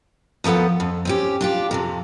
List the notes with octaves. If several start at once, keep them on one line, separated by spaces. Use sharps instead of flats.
D#2 F3 B3 A4 F#5
F2
C4 C#4 G4
D4 F4 G4
F2 C3 F3